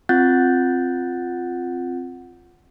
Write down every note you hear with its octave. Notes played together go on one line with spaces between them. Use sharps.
C4 F4 F#5 F#6 G6 A6